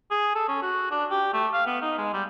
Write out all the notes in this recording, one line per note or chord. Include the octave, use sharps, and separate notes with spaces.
G#4
A4
C#4
F#4
D4
G4
A3
F5
B3
D#4
G#3
G3